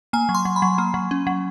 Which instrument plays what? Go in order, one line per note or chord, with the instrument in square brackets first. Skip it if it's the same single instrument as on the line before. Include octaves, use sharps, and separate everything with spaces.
[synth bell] A#3 G#5
F#3
C6
F#3
B5
F#3
A#3
F#3
C#4
F#3